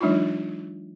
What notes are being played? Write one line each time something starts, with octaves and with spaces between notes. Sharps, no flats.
E3 F#3 G#3 D4 D#4 F4